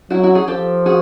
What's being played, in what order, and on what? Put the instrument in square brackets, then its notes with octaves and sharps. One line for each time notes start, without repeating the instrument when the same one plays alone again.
[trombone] F#3 [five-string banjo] E4 F#4
[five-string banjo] E4 F#4
F#4 G#4
[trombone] F3 [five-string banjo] G4 A4
[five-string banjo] F#4 G#4